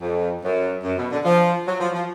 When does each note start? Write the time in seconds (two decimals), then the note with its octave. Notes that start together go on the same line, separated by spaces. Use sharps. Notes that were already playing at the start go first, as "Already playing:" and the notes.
0.01 F2
0.43 F#2
0.83 F#2
0.98 B2
1.11 D3
1.25 F3
1.67 F#3
1.80 F3
1.94 F3